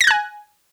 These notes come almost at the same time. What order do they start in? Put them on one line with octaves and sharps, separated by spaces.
A#6 G#6 F#6 G#5